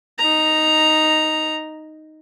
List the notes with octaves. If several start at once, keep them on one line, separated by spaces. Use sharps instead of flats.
D#4 A#5